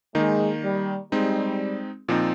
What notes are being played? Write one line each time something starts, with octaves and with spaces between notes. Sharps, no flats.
D#3 G#3 A#3 D#4
G3
G3 G#3 C4 D#4
A#2 F3 C4 D#4